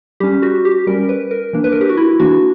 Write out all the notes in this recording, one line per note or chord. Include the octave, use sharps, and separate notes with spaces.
G3 C#4 G4
F#4
G4
G3 C#4 A#4
B4
A#4
E3 A#3 D4
B4
A#4
G4
F#4
E4
E3 A#3 D4 F#4